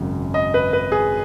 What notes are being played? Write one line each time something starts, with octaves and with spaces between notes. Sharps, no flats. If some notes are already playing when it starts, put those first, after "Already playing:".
Already playing: G#1 F#2 C#3
D#5
B4
B4
G#4